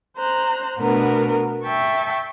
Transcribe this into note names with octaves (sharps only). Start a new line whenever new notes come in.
C5 A#5 F#6
B2 A3 B3 D4 A#4 B4
E5 G5 A5 C#6